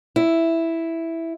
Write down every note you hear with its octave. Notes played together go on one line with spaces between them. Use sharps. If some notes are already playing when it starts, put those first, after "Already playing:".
E4